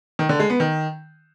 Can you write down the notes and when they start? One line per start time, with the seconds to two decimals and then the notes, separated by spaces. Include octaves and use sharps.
0.19 D#3
0.29 D3
0.39 G#3
0.50 B3
0.60 D#3